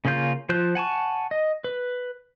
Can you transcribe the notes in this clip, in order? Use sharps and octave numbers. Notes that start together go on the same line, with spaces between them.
C#3 A#3 C#4 F4 G6
F3 F4 C5 F#6 G6
F#5 G#5 A5 C#6
D#5
B4